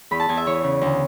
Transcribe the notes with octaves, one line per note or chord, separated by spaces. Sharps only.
E2 B5
A5
E2 G#5
E5
E3 C#5
C#3
D2